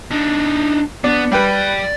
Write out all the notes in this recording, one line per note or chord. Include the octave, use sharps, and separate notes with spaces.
D4 D#4
B3 D4
G3 G4 B4 D5 G5